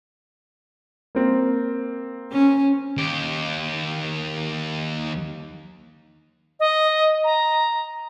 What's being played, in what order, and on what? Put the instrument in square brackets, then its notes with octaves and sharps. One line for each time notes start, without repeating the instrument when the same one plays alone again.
[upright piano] A#3 C4
[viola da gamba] C#4
[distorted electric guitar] D#2 G4
[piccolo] D#5
A#5